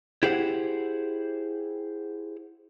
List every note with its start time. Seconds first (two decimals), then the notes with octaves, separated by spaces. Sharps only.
0.23 E4 G4 G#4 C5 F#5